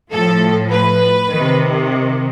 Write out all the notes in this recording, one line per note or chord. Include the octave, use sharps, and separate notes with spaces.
A2 F3 A4
B4
C3 D#3